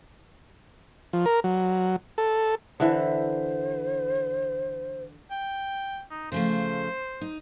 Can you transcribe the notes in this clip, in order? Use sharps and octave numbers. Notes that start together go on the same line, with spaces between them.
F3
A#4
F#3
A4
D3 E3 C5
G5
D#4
C#3 F3 A3 C5
D#4